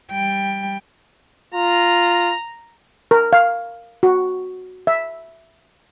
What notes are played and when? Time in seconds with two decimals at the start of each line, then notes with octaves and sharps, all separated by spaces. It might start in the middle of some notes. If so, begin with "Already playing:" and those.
0.11 G3 G5
1.54 F4 A#5
3.11 A#4
3.33 F5
4.03 F#4
4.87 E5